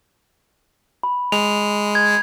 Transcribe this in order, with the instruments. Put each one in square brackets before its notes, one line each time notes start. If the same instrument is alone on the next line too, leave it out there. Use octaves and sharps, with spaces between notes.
[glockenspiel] B5
[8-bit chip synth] G#3 [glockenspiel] F7
[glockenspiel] G#6